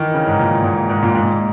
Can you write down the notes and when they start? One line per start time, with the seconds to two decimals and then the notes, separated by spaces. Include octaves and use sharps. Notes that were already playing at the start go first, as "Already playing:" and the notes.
Already playing: D#3 E3
0.14 C#3
0.27 G#2
0.39 A#2
0.64 G#2
0.89 G#2
1.03 A#2
1.15 G#2